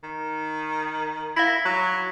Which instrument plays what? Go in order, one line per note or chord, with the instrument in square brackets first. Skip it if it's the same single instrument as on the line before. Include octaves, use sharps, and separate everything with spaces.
[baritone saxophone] D#3
[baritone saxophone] E4 [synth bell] F5 A#6 B6
[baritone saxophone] F#3